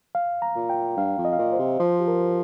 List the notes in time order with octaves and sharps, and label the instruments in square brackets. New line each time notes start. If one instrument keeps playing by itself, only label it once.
[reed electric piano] F5
A#5
[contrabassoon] A#2
[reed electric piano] G5
[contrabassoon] G2 [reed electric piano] F5
[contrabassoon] F2
[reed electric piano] D#5
F5
[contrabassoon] A#2 [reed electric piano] D#5
[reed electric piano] C5
[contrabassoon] C3
[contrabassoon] F3 [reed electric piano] C5
[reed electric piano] G4
A#4